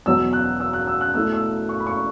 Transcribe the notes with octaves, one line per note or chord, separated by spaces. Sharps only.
E2 B2 F#3 E6
F#6
E6
F#6
E6
F#6
B2 A3 E4 E6
E6
C#6
B5
C#6